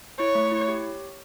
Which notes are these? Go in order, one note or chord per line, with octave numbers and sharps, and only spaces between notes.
E4 C#5
A3
E4
G4